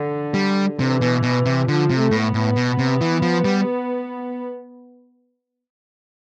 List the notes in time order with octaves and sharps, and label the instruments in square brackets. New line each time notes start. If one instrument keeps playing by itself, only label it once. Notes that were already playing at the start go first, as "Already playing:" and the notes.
Already playing: [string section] D3
[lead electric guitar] G3
[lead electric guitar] C3 [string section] E3
[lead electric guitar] B2
B2
C3
[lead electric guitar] D3 [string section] F3
[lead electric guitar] C3
[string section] A3
[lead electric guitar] A2
[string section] B3
[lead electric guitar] A2
B2
C3
E3
F3
G3